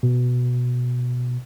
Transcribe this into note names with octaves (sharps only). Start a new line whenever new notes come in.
B2